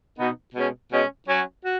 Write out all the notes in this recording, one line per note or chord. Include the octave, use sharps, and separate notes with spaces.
B2 B3 D#4
B2 G#3 C#4
B2 G#3 C#4
F#3 C#4 F#4
F#4